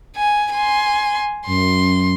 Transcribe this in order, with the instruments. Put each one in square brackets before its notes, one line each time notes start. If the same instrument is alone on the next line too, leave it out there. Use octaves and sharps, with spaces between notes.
[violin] G#5
G#5 C6
[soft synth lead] F#2 [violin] C6